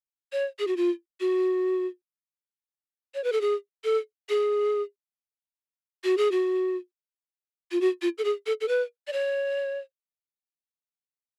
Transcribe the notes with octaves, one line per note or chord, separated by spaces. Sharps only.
C#5
G#4
F#4
F4
F#4
C#5
B4
A4
G#4
A4
G#4
F#4
G#4
F#4
F4
F#4
F4
A4
G#4
A4
A4
B4
D5
C#5